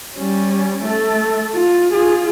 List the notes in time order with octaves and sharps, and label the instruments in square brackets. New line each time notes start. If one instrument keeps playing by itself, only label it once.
[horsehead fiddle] G3 C#4
A3 A4
F4
F4 G#4